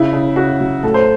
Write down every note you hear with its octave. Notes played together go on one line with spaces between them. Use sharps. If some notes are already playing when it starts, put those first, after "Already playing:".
Already playing: C#3 E4
C#3
C#3 F#4
F#3
A2 A4
C5